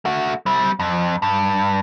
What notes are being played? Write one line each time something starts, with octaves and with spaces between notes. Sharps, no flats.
A3 F#4
G3 C4
F2
G2